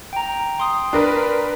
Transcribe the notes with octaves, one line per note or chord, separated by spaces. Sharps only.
G5 A#5
G5 C6 D#6
D4 A#4 B4